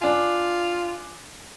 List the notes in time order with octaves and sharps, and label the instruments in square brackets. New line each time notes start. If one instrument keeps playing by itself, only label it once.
[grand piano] D4 G#5 [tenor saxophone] F4